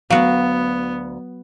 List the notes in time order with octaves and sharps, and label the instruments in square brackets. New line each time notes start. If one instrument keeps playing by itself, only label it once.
[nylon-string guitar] D2 F5 [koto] F#3 F#4 [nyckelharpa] B3